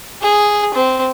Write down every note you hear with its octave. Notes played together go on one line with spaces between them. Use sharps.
G#4
C4